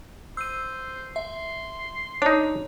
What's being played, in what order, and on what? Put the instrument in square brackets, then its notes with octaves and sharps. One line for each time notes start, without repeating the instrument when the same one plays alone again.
[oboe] C5 [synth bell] E6 D#7
[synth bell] E5 [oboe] C6
[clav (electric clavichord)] D4 D#4 [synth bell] C#5